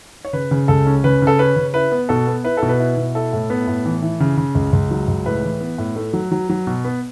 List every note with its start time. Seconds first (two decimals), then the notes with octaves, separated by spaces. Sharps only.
0.25 C#5
0.33 C#3 B4
0.51 C#3
0.68 C#2 A4
0.86 C#4
1.04 C#3 B4
1.22 C#3
1.27 A4
1.39 C#4 B4
1.56 C#3
1.74 E4 B4
1.92 B3
2.09 B2 A4
2.27 B3
2.44 E4 B4
2.57 A4
2.63 B2
2.69 B4
2.79 E4
2.97 B2
3.15 E4 A4
3.33 A2
3.50 B3
3.67 A2
3.85 E3
4.02 E3
4.20 C#3
4.37 C#3
4.55 C#2
4.73 C#2
4.91 F#3
5.08 C#2
5.26 A2 B4
5.43 E3
5.60 B3
5.78 A2
5.96 A3
6.13 F#3
6.32 F#3
6.49 F#3
6.67 B2
6.84 B3